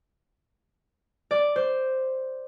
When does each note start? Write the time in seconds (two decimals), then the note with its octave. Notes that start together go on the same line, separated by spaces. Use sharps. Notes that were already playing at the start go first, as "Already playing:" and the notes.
1.31 D5
1.56 C5